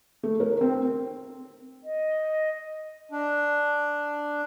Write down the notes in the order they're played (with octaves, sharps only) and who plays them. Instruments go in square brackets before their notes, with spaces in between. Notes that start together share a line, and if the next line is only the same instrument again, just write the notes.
[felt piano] A3
A#4
C4
[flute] D#5
[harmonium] D4